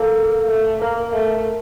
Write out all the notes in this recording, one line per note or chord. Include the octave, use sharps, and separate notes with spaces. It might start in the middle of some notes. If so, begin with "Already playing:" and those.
Already playing: A#3 A4
A3
A#3 A#4
A3